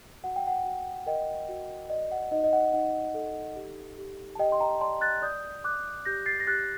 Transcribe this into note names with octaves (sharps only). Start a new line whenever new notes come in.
F#4 F#5
G5
F#5
F#4
A#4 D#5 G5
F#4
D5 D#5
F#5
D#4 D#5
D#5
F#5
D#4 F#5
A4
G4
G4
A5
G4 D#5 G5
C6
G5 A#5
D5 A5 C6
F#6 A6
D5 D#6 G6
D5 D6 F#6
G4 G6 A#6
A6 C7
A#6
G4 F#6 A6